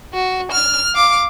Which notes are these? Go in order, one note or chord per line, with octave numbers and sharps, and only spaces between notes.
F#4
F6
F5 D6